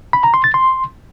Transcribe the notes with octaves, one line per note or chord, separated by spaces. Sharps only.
B5
A#5
C6
A6
C6